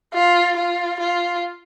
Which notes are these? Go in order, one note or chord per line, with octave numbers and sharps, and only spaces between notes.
F4
F4
F4